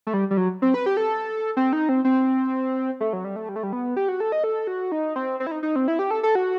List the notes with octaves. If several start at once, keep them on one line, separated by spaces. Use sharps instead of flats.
A3
G3
G3
F#3
C4
B4
G4
A4
C4
D#4
C4
C4
A3
F#3
G3
A3
G3
A3
G3
B3
G4
F#4
A4
D#5
A4
F#4
D#4
C4
C4
E4
D#4
D#4
C4
E4
G4
A4
A4
F#4